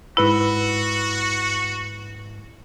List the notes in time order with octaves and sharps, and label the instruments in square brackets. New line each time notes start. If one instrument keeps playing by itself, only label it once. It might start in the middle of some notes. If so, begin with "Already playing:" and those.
[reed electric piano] G#2 B4 B5 [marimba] E4 [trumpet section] F#4